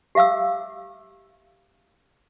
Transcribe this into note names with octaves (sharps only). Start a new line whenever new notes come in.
G4 E5 F5 D6 E6